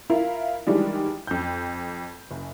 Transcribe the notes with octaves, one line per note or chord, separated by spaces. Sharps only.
E4 F4 A#4 F5
D#3 E3 G3 G#3 D4
F2 G6
F#1